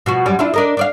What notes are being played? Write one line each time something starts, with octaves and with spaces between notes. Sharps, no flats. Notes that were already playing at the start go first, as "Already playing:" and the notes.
B2 F3 F#4
F#2 G3 C#4
D4 E4 F4
D4 A#4 D#5
D4 D5 F5